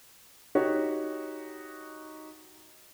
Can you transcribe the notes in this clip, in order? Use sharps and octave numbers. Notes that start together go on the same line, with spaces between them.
D#4 F#4 G4 C#5